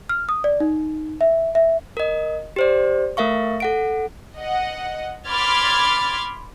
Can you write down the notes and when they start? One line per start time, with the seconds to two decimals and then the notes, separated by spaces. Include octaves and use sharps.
0.09 F6
0.29 D#6
0.44 D5
0.60 D#4
1.21 E5
1.55 E5
1.97 A#4 D#5
2.56 G4 C5 D5
3.17 A3 A#4 E5 F5 C#6
3.60 A4 F#5 D7
4.38 D#5 F#5
5.27 B5 C6 D6 F6 G#6 A6